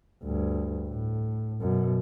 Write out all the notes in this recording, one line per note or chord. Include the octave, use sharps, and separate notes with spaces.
D2 G2
A2
F#2 B2